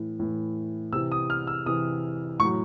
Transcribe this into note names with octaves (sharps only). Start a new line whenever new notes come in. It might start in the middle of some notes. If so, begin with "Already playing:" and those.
Already playing: A2 E3
A2 E3
C3 E3 E6
D#6
F6
E6
C3 E3 D#6
A2 C#6
F#3